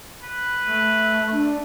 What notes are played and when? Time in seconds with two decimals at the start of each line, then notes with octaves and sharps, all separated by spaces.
0.23 B4
0.65 A3
1.32 D4